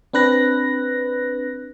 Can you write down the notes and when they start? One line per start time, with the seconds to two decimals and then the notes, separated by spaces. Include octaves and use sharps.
0.13 C4 D4 B4 F#6 A#6